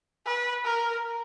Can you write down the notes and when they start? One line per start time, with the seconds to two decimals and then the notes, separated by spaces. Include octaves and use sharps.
0.26 B4
0.65 A#4